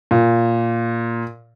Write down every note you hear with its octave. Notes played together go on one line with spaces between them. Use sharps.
A#2